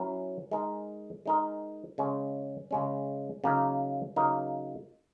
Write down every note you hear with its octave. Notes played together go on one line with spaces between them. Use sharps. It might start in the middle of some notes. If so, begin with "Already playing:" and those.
Already playing: F#3 C#4 E4 A#4
G#3 D#4 A#4
G#3 D#4 A#4
C#3 G#3 C#4
C#3 G#3 C#4
C#3 F#3 A#3 D#4 A#4
C#3 F#3 A#3 D#4 A#4